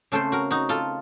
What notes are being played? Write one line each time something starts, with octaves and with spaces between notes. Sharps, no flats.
C#3 A3 C4 A4 C5
F#4 A#4
D#4 F#4
F4 A4